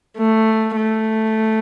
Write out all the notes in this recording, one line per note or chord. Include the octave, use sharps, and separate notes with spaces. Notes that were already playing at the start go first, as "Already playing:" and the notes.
A3
A3